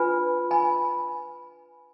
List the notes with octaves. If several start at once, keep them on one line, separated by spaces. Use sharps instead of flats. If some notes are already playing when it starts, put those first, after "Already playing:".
Already playing: D4 F4 B4 G#5 B5
G#5 B5